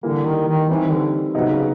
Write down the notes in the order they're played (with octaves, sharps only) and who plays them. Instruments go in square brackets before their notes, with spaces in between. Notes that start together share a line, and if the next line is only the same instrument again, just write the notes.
[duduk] D3 [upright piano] E3 G3 A#3
[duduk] D#3
D#3
[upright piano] D#3 G3 C4 [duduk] E3
[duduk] D3
[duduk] C3 [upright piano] F#3 B3 D#4
[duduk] C#3